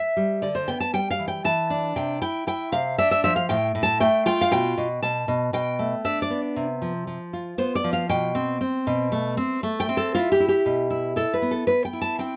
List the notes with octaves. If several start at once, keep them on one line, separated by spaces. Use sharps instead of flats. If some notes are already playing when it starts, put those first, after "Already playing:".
Already playing: E5
G3
D3 D5
C5
B3 G5
A5
G3 G5
F5
E3
G5
E3 A5
D4
C3 G5
E4 G5
E4 G5
C3 F5
D4 E5
E5
F3 E5
F5
A2 G5
A2
A5
A3 G5
F4 G5
F5
B2 G5
B2
B2 A5
B2
B2 G5
A3
D4 E5
D5
B3
C3
F3
F3
F4
B3 C5
D5
F3
F5
B2 G5
C4
C4
B2
A3
C4
A3
G5
C4
A4
E4 F4
G4
E4
G4
B2
E4
E4 A4
B4
B3
A4
B3 B4
G5
E4
A5
C4 G5